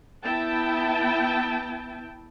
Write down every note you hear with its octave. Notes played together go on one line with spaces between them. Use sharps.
B3 E4 G5 A5